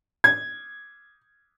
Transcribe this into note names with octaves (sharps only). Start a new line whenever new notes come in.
G#6